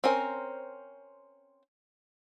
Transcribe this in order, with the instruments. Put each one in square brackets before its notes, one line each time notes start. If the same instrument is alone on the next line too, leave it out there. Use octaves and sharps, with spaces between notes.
[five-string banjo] C4 C#4 A#4 C5